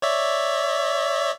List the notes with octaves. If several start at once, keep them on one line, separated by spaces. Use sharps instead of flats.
C#5 D5 E5